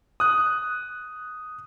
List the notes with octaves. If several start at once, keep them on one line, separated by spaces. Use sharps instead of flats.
D#6 F#6